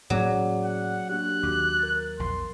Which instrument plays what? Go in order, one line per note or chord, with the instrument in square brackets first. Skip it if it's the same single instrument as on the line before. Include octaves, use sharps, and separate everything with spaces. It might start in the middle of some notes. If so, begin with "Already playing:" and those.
[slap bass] A2 A#3 C#4 [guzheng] F#3 [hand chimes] G#4 D5 D6
[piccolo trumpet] F#5
[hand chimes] A#3 D4 G4 [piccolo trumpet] F#6
[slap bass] D#2 [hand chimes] F#4 D6
[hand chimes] A#4 G#6 A6
[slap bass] A#1 E2 [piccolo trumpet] C6